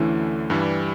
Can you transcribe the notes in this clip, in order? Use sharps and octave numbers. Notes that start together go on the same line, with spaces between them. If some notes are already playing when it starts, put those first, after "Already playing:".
Already playing: D2 D3 E3 A3 C#4
G2 E3 G3